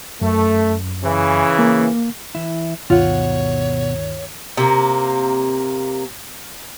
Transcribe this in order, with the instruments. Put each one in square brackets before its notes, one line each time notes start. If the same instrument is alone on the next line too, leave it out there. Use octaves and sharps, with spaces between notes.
[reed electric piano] F#2 [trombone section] A3
[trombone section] C#3 E3
[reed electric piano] A#3
[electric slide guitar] E3 E4
[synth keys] D2 G2 D#3 [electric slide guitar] B2 F#5 [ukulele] F4 [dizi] C#5
[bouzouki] C3 A#3